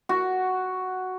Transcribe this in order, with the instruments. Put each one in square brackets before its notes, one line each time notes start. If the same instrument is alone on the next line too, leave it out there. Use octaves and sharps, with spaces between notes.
[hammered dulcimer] F#4